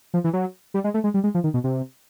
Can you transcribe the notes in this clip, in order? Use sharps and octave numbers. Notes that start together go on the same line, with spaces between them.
F3
E3
F#3
G3
G#3
A3
G#3
G3
G#3
F3
D#3
B2
C3